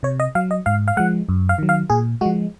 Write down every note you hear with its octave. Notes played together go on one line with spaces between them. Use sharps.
C3 C#5
D#5
F#3 F5
D#5
G#2 F5
F5
F3 G#3 F#5
F#2
F5
D#3 F#3
F5
A#2 G#4
F3 G#3 F#4